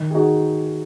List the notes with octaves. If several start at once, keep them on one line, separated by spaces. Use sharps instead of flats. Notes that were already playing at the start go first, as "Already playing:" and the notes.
Already playing: D#3
G#4
D#4 F#4